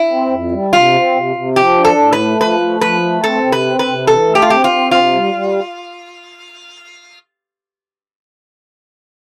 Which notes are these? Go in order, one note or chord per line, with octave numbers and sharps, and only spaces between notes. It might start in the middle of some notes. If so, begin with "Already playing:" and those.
Already playing: E4
C4
F2
G3
C3 F4
C4
C3
C3
F3 G4
D4
A4
A2
B4
A3
F3 B4
A3
F3 B4
A3
C4 A4
C3
B4
C4
B4
C3
E3 A4
A3
G4
F4
C4 G4
F4
C4
C3 F4
G3
G3